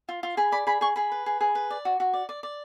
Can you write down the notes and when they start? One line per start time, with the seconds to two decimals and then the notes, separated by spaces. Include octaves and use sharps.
0.09 F4
0.23 F4
0.37 G#4 B5
0.52 D5 B5
0.67 G#4 B5
0.81 G#4 C#6
0.96 G#4 B5
1.12 B4
1.26 G#4
1.41 G#4
1.55 B4
1.70 D5
1.85 F#4
2.00 F#4
2.13 D5
2.29 D5
2.43 D5